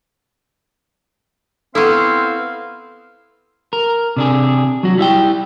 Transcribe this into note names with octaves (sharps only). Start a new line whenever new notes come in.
B3 C4 E4 A4 F5 A#5 C#6
A#4
C3 D4 G#4
F#3 F#4
G3 E4 E5 G5